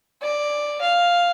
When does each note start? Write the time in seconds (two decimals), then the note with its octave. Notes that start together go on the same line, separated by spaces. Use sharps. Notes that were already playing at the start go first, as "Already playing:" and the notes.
0.22 D5
0.81 F5